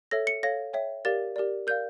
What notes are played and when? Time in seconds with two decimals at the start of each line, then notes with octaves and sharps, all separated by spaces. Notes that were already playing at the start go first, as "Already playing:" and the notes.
0.11 A4 C#5 E5 A#6
0.27 C#7
0.43 A4 C#5 F5 A#6
0.73 C#5 E5 G5
1.05 G4 A#4 D5 F5 A6
1.36 G4 A#4 D5
1.67 A#4 D5 F5 G6